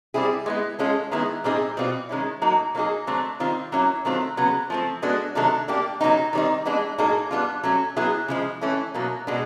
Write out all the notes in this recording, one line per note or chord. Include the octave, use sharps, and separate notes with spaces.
G3 C4 E4 G#4
G#3 B3 E4
G#3 C#4 F4 A4
D#3 G#3 B3 E4 G#4
A#2 G3 C4 D#4 G#4
B2 G3 C4 F4
D#3 G#3 C#4 E4
A2 F#3 A#3 D#4
F#3 A#3 D#4 G#4
D3 F#3 A3 C4
D#3 G3 C4 F4
F#3 A#3 C#4 E4
D#3 F#3 A3 C4 F4
C#3 F#3 B3
F3 A3 C4
G#3 B3 D4 F#4 A4
C3 D#3 F#3 A3 D4
G3 A#3 D4 G4
C#3 F#3 B3 D#4
D#3 G3 C4 D#4
E3 G#3 B3 D4
A2 F#3 A#3 D#4 G#4
G3 B3 D4 F4
F#3 A3 C#4
F#3 B3 E4 G#4
C#3 F3 G#3
E3 A3 C#4 E4
B2 F#3 A#3
B2 G#3 B3 D4